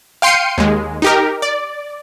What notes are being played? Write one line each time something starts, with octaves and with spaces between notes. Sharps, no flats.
F5 G5 C6 C7 C#7 D#7
D#2 G#3
D#4 G4 A#4
D5